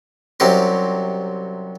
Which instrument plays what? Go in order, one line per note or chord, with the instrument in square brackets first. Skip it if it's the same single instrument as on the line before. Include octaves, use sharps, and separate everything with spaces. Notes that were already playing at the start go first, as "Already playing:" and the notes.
[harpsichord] C2 C3 F#3 C4 C#4 C6